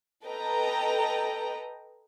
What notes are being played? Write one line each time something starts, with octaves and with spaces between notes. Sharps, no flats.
A4 B4 D#5 G5 A#5